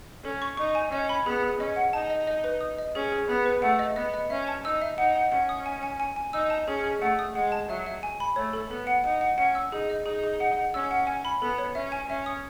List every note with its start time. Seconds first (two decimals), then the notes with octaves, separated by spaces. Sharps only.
0.24 C#4 A4
0.42 C#6
0.57 D#4 C#6
0.75 G#5
0.92 C#4 D#5
1.09 B5
1.26 B3 G#4
1.43 G#4
1.60 C#4 D#5
1.76 F#5
1.93 D#4 A5
2.10 D#5
2.27 D#5
2.44 B4
2.61 D#6
2.79 D#5
2.95 C#4 G#4
3.12 G#4
3.28 B3 G#4
3.46 B4
3.62 A3 F#5
3.79 D#5
3.96 B3 D#5
4.14 D#5
4.30 C#4 E5
4.48 A5
4.65 D#4 E6
4.82 E5
4.98 D#4 F#5
5.16 F#5
5.32 C#4 F#5
5.49 D#6
5.66 G#5
5.83 G#5
6.00 G#5
6.16 G#5
6.33 D#4 E6
6.50 A5
6.68 C#4 G#4
6.84 G#4
7.01 A3 F#5
7.19 D#6
7.35 G#3 F#5
7.52 A5
7.69 F#3 E5
7.87 E5
8.03 G#5
8.20 B5
8.36 A3 C#5
8.53 A4
8.70 B3 A4
8.87 F#5
9.04 D#4 F#5
9.21 F#5
9.38 C#4 F#5
9.55 E6
9.72 D#4 G#4
9.90 D#5
10.05 D#4 G#4
10.23 G#4
10.40 F#5
10.57 F#5
10.74 C#4 E6
10.91 F#5
11.07 G#5
11.25 B5
11.41 B3 A4
11.58 C#5
11.75 C#4 E5
11.92 G#5
12.09 C#4 E5
12.26 D#6